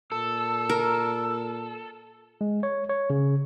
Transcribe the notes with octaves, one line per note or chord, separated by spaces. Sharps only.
A#2 A4 E6
A#4
G#3
C#5
C#5
C#3